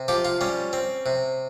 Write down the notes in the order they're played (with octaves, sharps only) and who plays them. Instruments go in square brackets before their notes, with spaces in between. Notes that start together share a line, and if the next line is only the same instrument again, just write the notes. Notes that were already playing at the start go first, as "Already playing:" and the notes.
Already playing: [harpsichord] C3
F3 G4
F4
G3 C#4
C4
C3